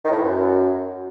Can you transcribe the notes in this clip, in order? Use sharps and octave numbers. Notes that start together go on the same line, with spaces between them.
D#3
A2
E3
F#2